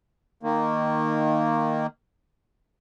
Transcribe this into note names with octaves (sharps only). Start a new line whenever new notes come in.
D#3 A#3